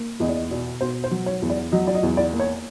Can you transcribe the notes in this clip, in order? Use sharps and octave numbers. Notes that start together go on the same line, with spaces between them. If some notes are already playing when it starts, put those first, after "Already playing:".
Already playing: A#3
E2 D#5
D5
D#5
B2 D5
B2 C5
C5
F#3
C#5
E2
D5
F#3 D#5
D5
D#5
E2
D5
A#3
C#5